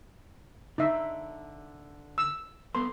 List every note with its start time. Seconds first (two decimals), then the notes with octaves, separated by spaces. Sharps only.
0.78 D3 D#4 E5
2.18 E6
2.75 B3 A4 B4 C6